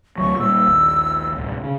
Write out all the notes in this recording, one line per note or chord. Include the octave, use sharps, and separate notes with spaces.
D2 F#3 C#6
A#2 G3 E6
A#1 D#2
D1 C2
C#3